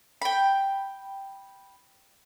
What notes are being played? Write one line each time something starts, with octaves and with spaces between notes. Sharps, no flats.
G5 B5